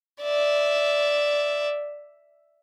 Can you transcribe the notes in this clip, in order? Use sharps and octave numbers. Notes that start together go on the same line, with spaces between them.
D5 E5